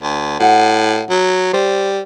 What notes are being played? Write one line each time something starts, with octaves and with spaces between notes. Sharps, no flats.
D2
A2 F#4 F#5
F#3
G3 C5